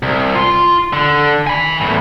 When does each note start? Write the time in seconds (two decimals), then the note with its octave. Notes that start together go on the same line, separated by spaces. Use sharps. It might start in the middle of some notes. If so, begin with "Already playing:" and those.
0.03 C2
0.35 F4 C6
0.93 D3
1.47 G#5 B5
1.81 E2 A2